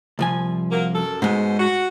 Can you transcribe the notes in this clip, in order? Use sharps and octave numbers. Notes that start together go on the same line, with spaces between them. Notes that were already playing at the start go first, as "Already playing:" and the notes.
C2 F3 G#5
F#3 A#3
F#2 A4
G#2 B2 G#3 C5 D#5
F#4